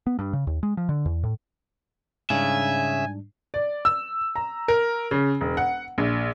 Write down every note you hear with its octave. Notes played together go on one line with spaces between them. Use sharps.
B3
G2
C#3
D#2
G#3
F3
D3
E2
A2
G#2 C#3 G3 D4 E5 G#5
D5
E6
A#5
A#4
C#3
E1
F#5
A#1